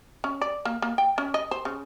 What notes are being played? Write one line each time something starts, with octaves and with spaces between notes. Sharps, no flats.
C#4
D5
A#3
A#3
G5
C#4
D#5
C5
C#3